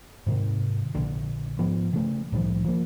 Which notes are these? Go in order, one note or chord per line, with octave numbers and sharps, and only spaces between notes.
G#2 C3 D#3
A#1 D3
G#2 F3 B3
C#3 A3
C2 A2 D#3 F3
F3 A#3